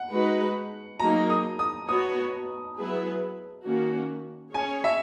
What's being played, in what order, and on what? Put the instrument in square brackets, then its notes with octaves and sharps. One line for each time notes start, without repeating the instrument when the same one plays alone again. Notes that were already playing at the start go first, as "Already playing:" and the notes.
Already playing: [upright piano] F#5
[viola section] G#3 D#4 F#4 B4
[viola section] F#3 A#3 D#4 G#4 [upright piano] A#5
[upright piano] D#6
D#6
[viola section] B3 F#4 C#5 [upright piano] D#6
[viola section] F#3 B3 E4 G#4 B4
D#3 A#3 C#4 F#4
[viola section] C#4 G#4 C#5 [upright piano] G#5
[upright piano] E5